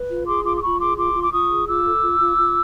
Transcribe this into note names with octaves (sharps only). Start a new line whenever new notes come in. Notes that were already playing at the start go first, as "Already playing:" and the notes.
Already playing: B4
F4
G#4 C6 D6
F4 C6 D6
D6
F4 B5 C#6
G#4 C6 D6
F4 C6 D6
F4
D6
F4 C#6 D#6
G#4
F4 D6 E6
A4
F4
F4
F4